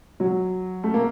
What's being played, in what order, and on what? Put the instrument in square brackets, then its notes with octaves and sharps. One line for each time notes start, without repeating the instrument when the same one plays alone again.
[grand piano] F#3
A3
A#3